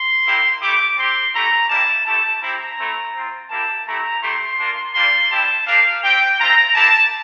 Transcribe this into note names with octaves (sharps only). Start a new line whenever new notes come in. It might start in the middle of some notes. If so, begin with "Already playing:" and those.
Already playing: C6
A#3 E4 G4
A3 E4 G4 D6
C4 G4 C6
A3 E4 G4 A#5
G3 A#3 E4 G4 A5
A3 E4 G4 A5
C4 E4 G4 A#5
A3 C4 E4
C4 F4
A#3 E4 G4 A5
A3 E4 G4 A#5
A3 E4 G4 C6
A#3 D4 F4
G3 A#3 D4 F4 C6
G3 C4 E4 G4 A5
A#3 D4 G4 F5
C4 G4 G5
A3 C4 F4 A#5
A#3 E4 G4 A5